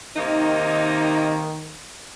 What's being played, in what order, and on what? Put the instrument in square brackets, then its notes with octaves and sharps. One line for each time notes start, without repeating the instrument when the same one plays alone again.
[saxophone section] C3 A#3 D#4 [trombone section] D#3